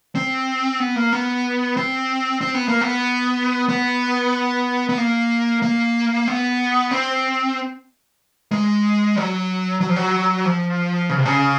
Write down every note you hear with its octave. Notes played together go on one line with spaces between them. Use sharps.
C4
B3
A#3
B3
C4
C4
B3
A#3
B3
B3
B3
A#3
A#3
B3
C4
G#3
F#3
F#3
F3
F#3
F3
C#3
C3
C#3